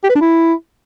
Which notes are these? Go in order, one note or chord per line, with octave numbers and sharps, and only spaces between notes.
G4
B4
D4
E4